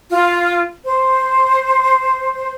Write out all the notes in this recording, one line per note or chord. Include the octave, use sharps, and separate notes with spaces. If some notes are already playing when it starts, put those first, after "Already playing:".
F4
C5